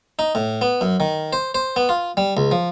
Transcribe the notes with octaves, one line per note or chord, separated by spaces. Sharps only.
D#4
A2
B3
F#2
D#3
C5
C5
B3
F4
G3
C#2
F3